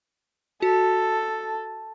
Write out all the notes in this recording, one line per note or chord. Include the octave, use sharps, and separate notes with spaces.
F#4 A4